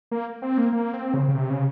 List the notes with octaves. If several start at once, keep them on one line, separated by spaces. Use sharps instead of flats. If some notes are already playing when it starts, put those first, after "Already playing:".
A#3
C4
A#3
A#3
C4
C#3
C#3
C3
C#3